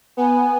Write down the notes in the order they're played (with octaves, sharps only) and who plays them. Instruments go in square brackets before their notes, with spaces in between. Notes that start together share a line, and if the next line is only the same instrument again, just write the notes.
[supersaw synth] B3 [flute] G#5